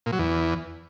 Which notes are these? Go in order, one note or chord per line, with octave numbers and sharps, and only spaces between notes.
A#2
F#3
E2